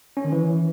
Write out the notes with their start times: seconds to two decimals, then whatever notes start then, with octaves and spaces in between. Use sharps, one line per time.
0.17 C#4
0.24 D#3
0.32 E3